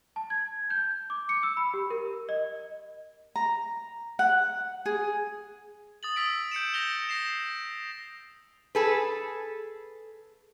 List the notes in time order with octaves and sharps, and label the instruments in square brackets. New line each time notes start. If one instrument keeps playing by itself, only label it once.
[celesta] A5
G#6
G6
D6
C#7
E6
B5
G4
A#4
D#5
[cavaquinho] A#5
F#5
G#4
[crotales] D#6 A6 F#7
D#6 E6 B6 D7
G6 C#7 D7 E7
G6 A#6 C#7 F7 G7
A#6 C7 E7
[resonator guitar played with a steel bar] G#4 A4 B4